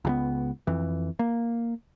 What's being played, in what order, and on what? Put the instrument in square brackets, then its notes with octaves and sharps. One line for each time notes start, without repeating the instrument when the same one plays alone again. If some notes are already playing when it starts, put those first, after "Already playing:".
[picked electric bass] C#2 F#3 B3
F2 E3
A#3